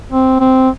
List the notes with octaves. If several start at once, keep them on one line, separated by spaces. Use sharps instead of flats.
C4
C4